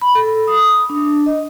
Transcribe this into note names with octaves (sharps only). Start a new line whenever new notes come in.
B5
A4
D#6
D4
D#5